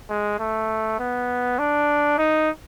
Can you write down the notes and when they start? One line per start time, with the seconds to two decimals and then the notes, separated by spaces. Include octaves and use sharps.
0.09 G#3
0.39 A3
0.99 B3
1.59 D4
2.18 D#4